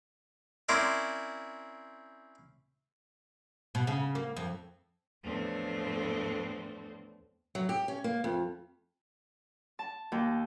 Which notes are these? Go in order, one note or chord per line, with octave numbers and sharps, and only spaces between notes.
C4 C#4 E4 A#4 C5 D5
B2
C#3
A#3
F2
E2 A2 F3 A3 C4 D4
F#3
G4
C#4
A#3
F2
A5
D#2